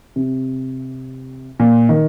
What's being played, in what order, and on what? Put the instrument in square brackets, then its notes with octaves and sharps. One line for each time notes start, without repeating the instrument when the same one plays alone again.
[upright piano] C3
A#2
D#3